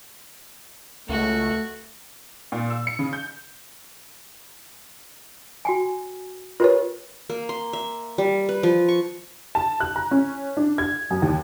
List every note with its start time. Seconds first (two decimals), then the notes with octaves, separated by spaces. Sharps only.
1.09 C#2 A3 F#4
2.52 A#2
2.70 E6
2.87 C#7
2.99 C#3
3.13 G6
5.65 F#4 G5 G#5
6.60 F4 G4 A#4 B4 C#5
7.30 A#3
7.49 C6
7.73 E5
8.18 G3
8.49 B4
8.63 F3
8.88 C#6
9.55 A5
9.80 F#6
9.96 A#5
10.11 C#4
10.57 D4
10.78 G#6
11.11 F#2
11.22 D#2